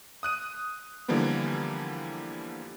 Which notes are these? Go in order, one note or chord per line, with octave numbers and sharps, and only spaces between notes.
D#6 F#6 D#7
D3 E3 F3 G3 A#3 B3